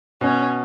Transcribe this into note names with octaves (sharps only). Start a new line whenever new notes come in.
B2 C#4